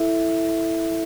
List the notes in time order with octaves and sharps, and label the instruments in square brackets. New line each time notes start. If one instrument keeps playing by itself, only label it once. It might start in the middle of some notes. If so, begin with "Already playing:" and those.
Already playing: [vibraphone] E4 A4 E5